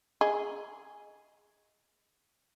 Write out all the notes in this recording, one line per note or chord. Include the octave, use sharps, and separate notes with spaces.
G#4 D#5